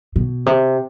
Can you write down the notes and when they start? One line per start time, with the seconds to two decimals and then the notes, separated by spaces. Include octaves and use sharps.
0.16 B2
0.46 C3